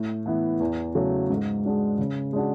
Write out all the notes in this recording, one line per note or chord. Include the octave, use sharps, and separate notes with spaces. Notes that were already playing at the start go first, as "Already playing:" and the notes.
Already playing: A2
E3 B3 E4
E2
C#3 F#3 A3
G#2
G#3 D4 F#4
C#3
G#3 D4 F#4